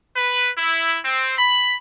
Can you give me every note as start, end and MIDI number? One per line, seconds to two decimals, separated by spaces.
0.15 0.50 71
0.56 0.98 64
1.04 1.37 60
1.38 1.76 83